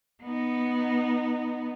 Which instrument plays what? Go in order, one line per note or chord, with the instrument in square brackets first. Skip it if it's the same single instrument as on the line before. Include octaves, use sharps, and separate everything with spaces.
[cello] B3 D#4